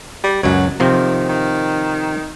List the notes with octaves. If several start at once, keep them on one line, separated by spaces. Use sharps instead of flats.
G3
C#2 F#2 F#3
C3 D#3 F3 C4
D#3